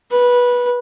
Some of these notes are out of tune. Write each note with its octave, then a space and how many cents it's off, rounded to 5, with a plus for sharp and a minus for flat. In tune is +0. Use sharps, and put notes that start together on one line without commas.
B4 -15